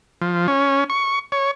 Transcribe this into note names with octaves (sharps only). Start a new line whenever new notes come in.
F3
C#4
C#6
C#5